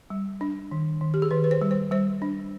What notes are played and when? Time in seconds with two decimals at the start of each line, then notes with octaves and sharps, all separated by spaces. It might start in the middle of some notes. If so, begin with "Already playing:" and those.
0.10 G3
0.41 D4
0.71 D#3
1.01 D#3
1.14 G4
1.22 G#4
1.31 D#3 B4
1.44 B4
1.51 C5
1.61 G3
1.71 C5
1.91 G3 C5
2.22 D4